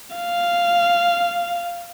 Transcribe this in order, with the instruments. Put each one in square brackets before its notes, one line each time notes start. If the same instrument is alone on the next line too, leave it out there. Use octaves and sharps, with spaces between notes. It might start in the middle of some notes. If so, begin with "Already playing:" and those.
[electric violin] F5